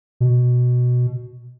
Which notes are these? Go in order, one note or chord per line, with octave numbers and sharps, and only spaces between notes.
B2